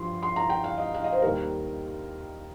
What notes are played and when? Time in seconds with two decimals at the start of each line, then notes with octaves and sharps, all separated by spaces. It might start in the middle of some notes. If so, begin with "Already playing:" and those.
Already playing: G2 F3 C6
0.23 C6
0.36 A#5
0.50 G5
0.64 F5
0.78 D#5
0.94 F5
1.04 D#5
1.12 C5
1.22 D#2 D#3 G3 A#4